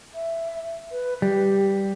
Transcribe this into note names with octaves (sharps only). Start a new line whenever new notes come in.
E5
B4
G3 G4